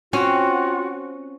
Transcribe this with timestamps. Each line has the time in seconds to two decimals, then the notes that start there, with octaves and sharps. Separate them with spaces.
0.13 C4 C#4 F4 F#4